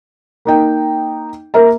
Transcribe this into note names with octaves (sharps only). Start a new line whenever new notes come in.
A#3 D#4 G5
A#3 A#4 E5 A#5